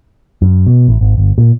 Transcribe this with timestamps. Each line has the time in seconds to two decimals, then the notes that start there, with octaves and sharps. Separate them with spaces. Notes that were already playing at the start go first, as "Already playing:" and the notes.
0.42 F#2
0.67 B2
0.88 A1
1.01 G#1
1.18 G1
1.38 A#2